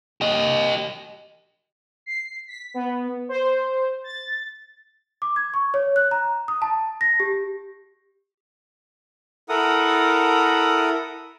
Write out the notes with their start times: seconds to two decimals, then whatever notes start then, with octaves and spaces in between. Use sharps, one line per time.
0.21 G4 D#5
2.06 C7
2.47 B6
2.74 B3
3.29 C5
4.04 A6
5.22 D6
5.36 G#6
5.54 C#6
5.74 C#5
5.96 F#6
6.11 A#5
6.48 D#6
6.62 A5
7.01 A#6
7.20 G4
9.49 E4 A4 A#4 F#5 D#6